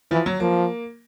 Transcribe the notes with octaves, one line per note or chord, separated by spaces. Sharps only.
E3 F3
F#3
F3 A#3